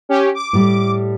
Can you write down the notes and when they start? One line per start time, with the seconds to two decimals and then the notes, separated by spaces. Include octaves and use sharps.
0.09 C#4 G4
0.34 D6
0.53 A2 G3 A3